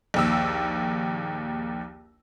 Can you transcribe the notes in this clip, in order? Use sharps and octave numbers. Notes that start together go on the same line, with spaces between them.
A#1 D#2 E6